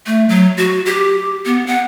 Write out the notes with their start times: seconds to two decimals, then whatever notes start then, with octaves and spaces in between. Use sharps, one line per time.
0.06 A3
0.29 F#3
0.57 F#4
0.86 G4
1.46 B3
1.67 F#5